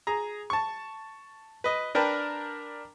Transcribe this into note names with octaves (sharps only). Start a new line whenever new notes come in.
G#4 A#5
A5 C#6
B4 D#5
D4 A#4 B4 G5 A5